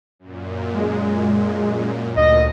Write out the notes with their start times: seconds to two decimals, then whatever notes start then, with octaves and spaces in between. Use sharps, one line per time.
0.19 F#2 A#2
0.74 G#3
2.17 D2 A#2 D#5